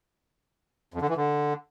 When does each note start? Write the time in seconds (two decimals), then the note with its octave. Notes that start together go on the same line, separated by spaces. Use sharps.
0.94 F2
1.02 D3
1.09 E3
1.17 D3